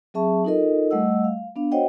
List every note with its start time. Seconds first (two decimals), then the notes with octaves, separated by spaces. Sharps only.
0.14 F#3 C4 G#4 E5 A5 C#6
0.45 D#4 F4 A4 A#4 D#5
0.91 G3 A3 D#5 F#5 E6
1.24 F5
1.56 B3 D4 F5
1.72 F#4 C5 C#5 D#5 F#5 G5